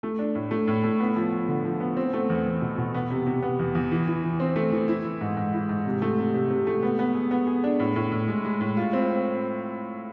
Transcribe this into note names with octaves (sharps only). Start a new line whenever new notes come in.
A3
D4
A2
A3
A2
A3
B3
F3
F3
D3
F3
B3
C4
A3
E2
E2
B2
B2
B3
C3
C3
B3
E2
E2
E3
E3
E3
C4
A3
E3
E4
E3
G#2
G#2
E4
G#2
C3
A3
C3
C3
C3
A3
B3
B3
G#4
B3
G#4
D4
A2
A2
A2
G#3
G#3
A2
F4
C4